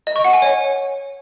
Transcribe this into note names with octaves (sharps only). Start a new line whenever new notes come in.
D#5
C#6
F#5
G#5
C#5